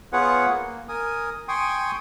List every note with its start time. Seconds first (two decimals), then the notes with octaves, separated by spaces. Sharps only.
0.13 B3 F4 G#4 B4 C#5 F#5
0.49 A#3
0.89 A#4 G#5 D#6
1.48 G5 G#5 C6 C#6 D#6